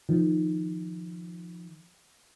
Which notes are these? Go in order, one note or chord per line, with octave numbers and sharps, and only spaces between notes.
D#3 F3